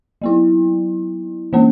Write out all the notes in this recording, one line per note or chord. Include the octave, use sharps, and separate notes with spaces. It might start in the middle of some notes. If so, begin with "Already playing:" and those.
F#3 B3 E4
E3 A#3 C#4